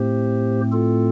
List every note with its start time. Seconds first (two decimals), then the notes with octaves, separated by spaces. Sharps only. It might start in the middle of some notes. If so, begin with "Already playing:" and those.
Already playing: A2 A3 C4 G4 C5
0.72 F4 A4